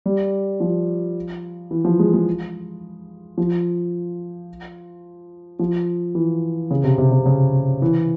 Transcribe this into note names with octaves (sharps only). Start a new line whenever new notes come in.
G3
F3
E3
F3
G#3
G#3
F3
F3
E3
C#3
C3
C3
C3
C#3
E3